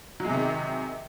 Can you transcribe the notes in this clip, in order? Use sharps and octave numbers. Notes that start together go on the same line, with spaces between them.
C3 D#3 F#3 G#3